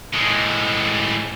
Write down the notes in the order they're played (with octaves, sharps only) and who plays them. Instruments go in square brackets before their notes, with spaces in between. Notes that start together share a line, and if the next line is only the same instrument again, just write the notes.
[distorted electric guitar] A2 G#3